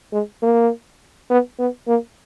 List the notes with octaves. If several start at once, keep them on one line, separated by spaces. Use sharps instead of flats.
G#3
A#3
B3
B3
A#3